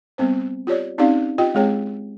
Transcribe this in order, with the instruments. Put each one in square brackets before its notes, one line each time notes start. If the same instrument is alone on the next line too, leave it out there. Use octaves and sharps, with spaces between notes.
[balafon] G3 B3 C4 C5
F4 G4 C#5 D5
C4 C#4 D#4 G4 D5 F5
F4 G4 D#5 G5
G#3 C4 G#4 C#5 G5